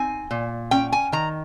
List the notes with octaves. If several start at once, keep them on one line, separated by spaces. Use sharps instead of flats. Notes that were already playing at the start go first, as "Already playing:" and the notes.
Already playing: C4 D#4 G#5
A#2
C#4 G5
G#5
D#3 A#5